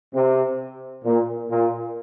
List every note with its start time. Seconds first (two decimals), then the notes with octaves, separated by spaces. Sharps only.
0.14 C3
1.05 A#2
1.51 A#2